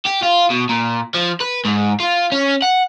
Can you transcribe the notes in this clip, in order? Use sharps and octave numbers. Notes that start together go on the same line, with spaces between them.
G4
F4
B2
A#2
F3
B4
G#2
F4
C#4
F#5